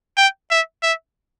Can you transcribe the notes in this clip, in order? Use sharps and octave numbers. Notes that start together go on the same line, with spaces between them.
G5
E5
E5